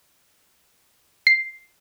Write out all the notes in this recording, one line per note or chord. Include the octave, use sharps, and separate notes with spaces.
C7